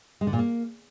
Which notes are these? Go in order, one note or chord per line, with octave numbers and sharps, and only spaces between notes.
G#3
D3
A#2
A#3